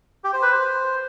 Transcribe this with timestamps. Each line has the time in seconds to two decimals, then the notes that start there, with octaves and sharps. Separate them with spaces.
0.24 G4
0.33 C5
0.43 B4
0.52 C5